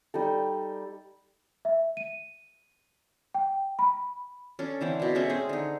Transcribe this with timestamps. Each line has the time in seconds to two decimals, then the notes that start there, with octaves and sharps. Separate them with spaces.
0.14 G3 D#4 A4
1.65 E5
1.97 D#7
3.34 G5
3.79 B5
4.59 C#4 D4 A4
4.81 D3 E3 C4
5.00 B2 D4
5.15 G#3 A3 C#4 E5
5.29 C4 G#4
5.49 D3 D#4